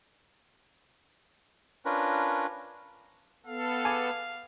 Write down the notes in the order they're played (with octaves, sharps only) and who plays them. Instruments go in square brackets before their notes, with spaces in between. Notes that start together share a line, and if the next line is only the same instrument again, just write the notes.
[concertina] C#4 D4 F4 A#4 B4
[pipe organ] B3 A4 [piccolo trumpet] F5
[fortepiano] G#4 G#5 D6